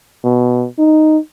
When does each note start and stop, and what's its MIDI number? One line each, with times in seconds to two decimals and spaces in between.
0.24 0.66 47
0.78 1.18 63